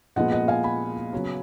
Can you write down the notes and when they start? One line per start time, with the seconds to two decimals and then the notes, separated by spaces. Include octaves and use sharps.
0.16 A#2 F3 G#3 B3 D#5 F#5
0.32 D#5 F#5
0.48 F5 G#5
0.64 G#5 B5
1.12 C#3 F#3 B3